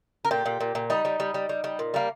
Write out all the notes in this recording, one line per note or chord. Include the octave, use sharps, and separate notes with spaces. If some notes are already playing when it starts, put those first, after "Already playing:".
A#4
A#2 G4
A#2
A#2
A#2
G3 D#4
G3
G3
G3
G3
G3
A#2
G3 A#3